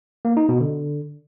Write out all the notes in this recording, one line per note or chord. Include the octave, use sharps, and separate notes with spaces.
A#3
D#4
B2
D3